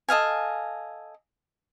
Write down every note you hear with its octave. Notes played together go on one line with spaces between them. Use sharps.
A4 D#5 F5 G#5